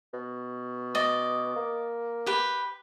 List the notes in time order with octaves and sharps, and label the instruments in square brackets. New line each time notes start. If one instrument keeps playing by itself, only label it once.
[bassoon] B2
[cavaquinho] D5 D#5
[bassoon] A#3
[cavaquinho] G4 B4